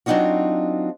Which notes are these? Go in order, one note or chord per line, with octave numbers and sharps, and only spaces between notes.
F#3 C4 D4 D#4 F4 F#4